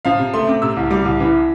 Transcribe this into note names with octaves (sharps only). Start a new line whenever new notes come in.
F3 F5
C3
A3 C6
C4 D6
C3 E6
C2
G3 D6
C2
E3